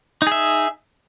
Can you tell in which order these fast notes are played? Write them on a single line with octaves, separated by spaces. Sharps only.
D#4 G#4 E5